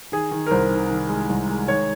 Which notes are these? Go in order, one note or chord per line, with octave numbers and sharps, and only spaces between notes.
D#3 G#4
D#3
A#4
C2 C5
D#3
D#3
G#3
C2
G#3
D#3 C#5